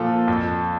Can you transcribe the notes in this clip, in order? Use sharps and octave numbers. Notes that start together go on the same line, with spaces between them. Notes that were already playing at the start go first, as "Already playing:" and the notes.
Already playing: A#2 F3 A4
F2